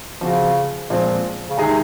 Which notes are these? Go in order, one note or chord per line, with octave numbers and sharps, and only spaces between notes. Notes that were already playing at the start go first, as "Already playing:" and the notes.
C#3 F3 C4 F#4
A#2 F3 G#3 C4
C#3
C3 D#3 G#3 D#4 G#4